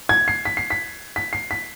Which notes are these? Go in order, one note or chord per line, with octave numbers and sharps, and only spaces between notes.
G#6
C7
B6
C7
B6
B6
C7
B6